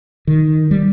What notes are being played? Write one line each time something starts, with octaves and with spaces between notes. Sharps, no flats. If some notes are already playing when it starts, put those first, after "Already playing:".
D#3
G3